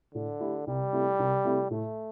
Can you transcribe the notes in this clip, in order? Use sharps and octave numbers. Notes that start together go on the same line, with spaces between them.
A2 D3
A3 E4 G4
C2 G3
C3 A3 E4 G4
C2
C3 A3 E4 G4
A2 A3